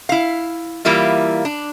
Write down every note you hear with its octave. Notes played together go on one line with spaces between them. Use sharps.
E4 F5
E3 G3 A#3 E4 F4
D4